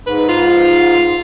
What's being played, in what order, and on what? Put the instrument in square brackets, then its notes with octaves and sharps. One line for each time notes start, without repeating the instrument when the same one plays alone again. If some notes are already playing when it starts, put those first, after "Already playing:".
[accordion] G#2 [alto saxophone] B4
[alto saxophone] F4